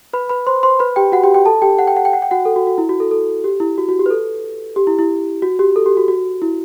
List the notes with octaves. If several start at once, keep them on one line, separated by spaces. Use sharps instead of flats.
B4 B5
B4 B5
C5 C6
C5 C6
B4 B5
G4 G5
F#4 F#5
G4 G5
G4 G5
A4 A5
G4 G5
F#5
G5
F#5
G5
F#5
G5
F#4 F#5
A4
F#4
F#4
E4
F#4
A4
A4
G4
E4
F#4
F#4
G4
B4
A4
G4
E4
E4
F#4
G4
A4
G4
F#4
F#4
E4